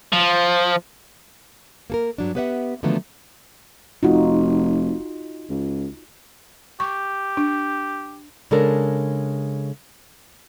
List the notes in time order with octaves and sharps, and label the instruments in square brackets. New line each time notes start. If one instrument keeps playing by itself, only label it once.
[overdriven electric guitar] F3
[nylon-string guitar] A#3 A4 A#4
G2 F#3 D4
B3 G4 B4 C5 E5 F#5
D3 D#3 F3 F#3 A3 B3
[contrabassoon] F1 [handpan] D#4 F4 F#4
[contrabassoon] C#2
[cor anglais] G4 [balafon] C#6
[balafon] D4
[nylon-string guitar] C#3 G#3 D4 A4 A#4